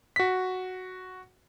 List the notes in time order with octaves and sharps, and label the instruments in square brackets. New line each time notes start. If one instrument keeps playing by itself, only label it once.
[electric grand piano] F#4 B6